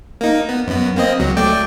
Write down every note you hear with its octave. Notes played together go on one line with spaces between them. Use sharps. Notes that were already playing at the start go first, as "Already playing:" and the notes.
A#3 D#4
B3
F#2 B3
A#3 C4 D#5
C#2 F#3
A3 D5 G5